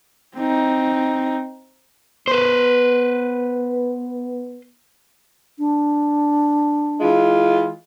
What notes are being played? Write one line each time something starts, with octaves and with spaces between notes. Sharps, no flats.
C4 D#4
B3 B4 C5
D4
E3 G#3 F4